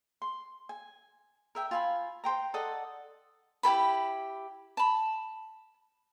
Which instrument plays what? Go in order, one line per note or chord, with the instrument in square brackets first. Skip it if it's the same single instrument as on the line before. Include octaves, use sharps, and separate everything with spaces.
[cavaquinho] C6
G#5
A#4 E5 G5
F4 G#5 B5
C5 G5 A#5
A4 D5 D#5 F#5
E4 G4 A4 B5
A5 B5